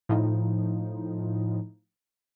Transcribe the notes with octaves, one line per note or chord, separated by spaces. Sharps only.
A2 F3 D#4